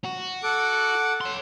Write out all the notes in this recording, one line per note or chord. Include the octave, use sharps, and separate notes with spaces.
F#4
A4 F#5 D6
C#5 C6